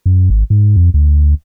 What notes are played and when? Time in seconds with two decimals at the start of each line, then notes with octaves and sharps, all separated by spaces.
0.06 F#2
0.30 G#1
0.50 G#2
0.76 F2
0.94 D2